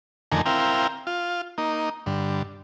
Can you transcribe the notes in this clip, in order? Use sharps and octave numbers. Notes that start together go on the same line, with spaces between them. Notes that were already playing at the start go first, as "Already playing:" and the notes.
F2 D3 D#3 A3 A#4 G#5
C4 E4 A#4 F5 G5
F4
A#3 D#4
G2 D3